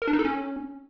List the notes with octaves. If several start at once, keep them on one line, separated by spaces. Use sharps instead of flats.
A#4
D4
D#4
A4
C#4